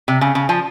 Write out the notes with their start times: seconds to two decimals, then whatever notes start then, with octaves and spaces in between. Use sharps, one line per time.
0.08 C3
0.21 C#3
0.35 C#3
0.49 F3